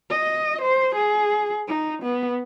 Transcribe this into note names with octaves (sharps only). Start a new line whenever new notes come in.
D#5
C5
G#4
D#4
B3